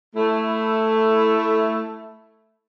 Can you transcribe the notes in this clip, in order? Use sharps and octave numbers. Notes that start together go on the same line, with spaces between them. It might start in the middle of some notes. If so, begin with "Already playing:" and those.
A3 E4